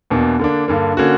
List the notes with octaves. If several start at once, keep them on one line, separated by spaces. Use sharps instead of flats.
E2 B2 A#3 D4
D3 A#3 D4
G2 D3 A#3
D3 A#3 C#4 F#4